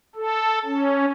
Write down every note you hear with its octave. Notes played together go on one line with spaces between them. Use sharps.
A4
C#4